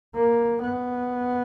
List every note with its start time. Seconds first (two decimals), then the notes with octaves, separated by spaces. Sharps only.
0.15 A#3
0.61 B3